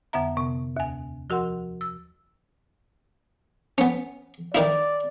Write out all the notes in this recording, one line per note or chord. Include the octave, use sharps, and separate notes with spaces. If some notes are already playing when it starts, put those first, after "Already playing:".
F2 D3 B3 E5 A#5
C3 B3
D#2 G#5
F3 F#4 A#4 F#5 C6
E6
B3 C#4
D#3 D#4 E4 D5